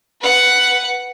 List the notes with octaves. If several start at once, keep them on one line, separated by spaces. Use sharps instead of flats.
B4 F#5